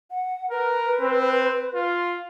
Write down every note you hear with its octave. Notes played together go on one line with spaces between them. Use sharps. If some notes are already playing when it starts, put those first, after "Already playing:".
F#5
A#4 B4
C4
F4